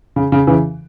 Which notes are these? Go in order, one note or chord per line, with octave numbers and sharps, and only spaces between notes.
C#3
C#3
C#3 E3